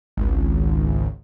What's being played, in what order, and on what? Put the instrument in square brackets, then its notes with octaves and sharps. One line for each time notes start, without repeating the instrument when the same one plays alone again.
[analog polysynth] G#1 C#2